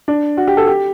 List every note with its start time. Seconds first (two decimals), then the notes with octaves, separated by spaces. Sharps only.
0.08 D4
0.37 F#4
0.47 G4
0.57 A4
0.67 G4